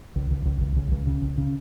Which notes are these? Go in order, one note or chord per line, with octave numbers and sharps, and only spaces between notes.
C#2
C#2
C#2
C#2
C#2
C#2
C#3
C#2
C#3